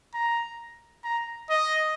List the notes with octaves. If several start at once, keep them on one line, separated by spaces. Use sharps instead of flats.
A#5
A#5
D#5